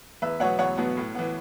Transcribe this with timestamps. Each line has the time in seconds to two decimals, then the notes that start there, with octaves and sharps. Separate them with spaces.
0.22 E2 B4 E5
0.40 B2 F#3 B3 C#5 F#5
0.59 E2 C#5 F#5
0.77 B2 F#3 B3
0.97 A2
1.15 E3 B3